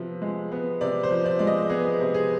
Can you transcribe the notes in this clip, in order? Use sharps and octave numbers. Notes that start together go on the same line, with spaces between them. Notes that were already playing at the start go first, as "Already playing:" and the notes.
Already playing: C3 F3 B3
G#3
B3
C3 D5
C5
F3
D5
G#3 D5
D#5
B3 G#4
C3
G#4